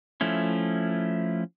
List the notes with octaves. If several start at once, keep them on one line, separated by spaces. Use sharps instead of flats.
F3 A3 C#4 E4